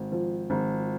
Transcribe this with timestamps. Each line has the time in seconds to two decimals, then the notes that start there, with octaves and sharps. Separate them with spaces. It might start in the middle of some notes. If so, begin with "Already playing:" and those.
Already playing: G#1
0.12 F3
0.50 G#1